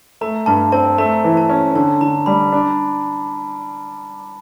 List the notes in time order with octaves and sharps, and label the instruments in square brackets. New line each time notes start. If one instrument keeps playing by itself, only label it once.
[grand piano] A3 [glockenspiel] A#5
[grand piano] G2 [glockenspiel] A5
[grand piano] C4 [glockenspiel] A5
[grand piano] A3 [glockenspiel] A#5
[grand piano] E3
[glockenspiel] A5
[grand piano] C#4
[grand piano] D3 [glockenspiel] A5
[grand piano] D3 [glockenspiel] A#5
[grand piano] G3 [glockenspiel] B5
[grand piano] D4